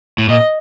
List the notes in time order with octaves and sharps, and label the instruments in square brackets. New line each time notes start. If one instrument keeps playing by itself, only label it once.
[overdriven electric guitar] A2
[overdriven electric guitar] A#2 [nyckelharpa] D#5